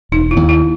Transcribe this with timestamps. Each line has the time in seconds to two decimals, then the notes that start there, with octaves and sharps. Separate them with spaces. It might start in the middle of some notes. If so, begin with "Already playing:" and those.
0.12 E1 D#4
0.31 E4
0.36 D#2
0.49 E4